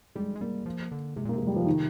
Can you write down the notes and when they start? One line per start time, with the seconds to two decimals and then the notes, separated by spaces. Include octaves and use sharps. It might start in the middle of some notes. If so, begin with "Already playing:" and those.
0.15 G3 G#3
0.36 G#3
0.41 G3 A#3
0.66 F3
0.92 D3
1.16 C3 G#3
1.25 A#2
1.29 C3 A#3
1.38 G#3
1.47 G3
1.56 F3
1.66 D#3